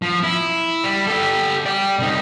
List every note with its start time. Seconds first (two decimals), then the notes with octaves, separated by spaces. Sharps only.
0.02 F3
0.23 E4
0.84 G3
1.07 G4 A4
1.66 D5 G5
1.99 C2 D#4